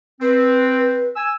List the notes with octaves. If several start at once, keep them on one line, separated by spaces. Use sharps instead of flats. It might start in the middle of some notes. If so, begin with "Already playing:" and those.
C4 B4
G#5 E6